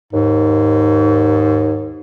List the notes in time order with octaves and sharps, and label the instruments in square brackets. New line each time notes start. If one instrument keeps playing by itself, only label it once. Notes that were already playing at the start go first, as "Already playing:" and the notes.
[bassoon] D#2 [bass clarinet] G#2